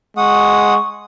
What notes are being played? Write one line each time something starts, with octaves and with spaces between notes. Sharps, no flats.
G#3 F#5 C#6 D#6